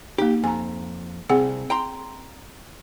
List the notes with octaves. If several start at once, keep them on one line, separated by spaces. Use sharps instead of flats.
A#3 D#4 G4
F2 G#5 A#5
C2 C4 G#4 F#5
G5 A#5 C6